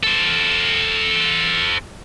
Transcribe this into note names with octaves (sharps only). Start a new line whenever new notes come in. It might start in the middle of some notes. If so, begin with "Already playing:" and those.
A4 C5